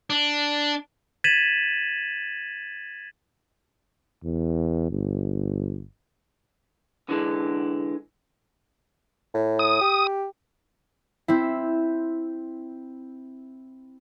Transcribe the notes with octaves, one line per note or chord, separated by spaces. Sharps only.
D4
G#6 A6 B6 D#7 E7 F#7
E2
G1
D3 E3 G#3 D4
A2
D#6
G4
C4 E4